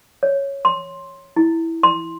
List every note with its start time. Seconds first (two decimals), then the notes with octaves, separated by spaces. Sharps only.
0.23 C#5
0.65 C6
1.36 E4
1.83 C6